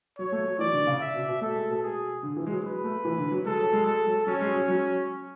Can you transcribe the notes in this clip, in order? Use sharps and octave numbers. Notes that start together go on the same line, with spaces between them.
F#3 C#5
A3
F#3
E3 D5
D3
C#3
E5
B2
B2
A3 A4
G#3
B2
G#4
D3
E3
G#3
F#3
G#3 B4
A3
E3
D3
F#3
G#3 A4
F#3
G#3
G#3 A4
F#3
F#3 C#4
G#3
F#3
F#3